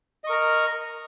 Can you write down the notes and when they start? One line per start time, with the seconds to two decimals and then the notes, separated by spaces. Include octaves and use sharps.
0.24 D#5
0.27 C#6
0.29 A#4
0.32 A#5